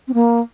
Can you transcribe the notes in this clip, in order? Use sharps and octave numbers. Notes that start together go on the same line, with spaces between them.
C4
A#3